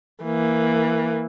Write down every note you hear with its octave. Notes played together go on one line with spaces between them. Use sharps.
E3 A#3